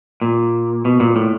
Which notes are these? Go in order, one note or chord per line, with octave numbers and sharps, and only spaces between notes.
A#2
B2
A#2
A2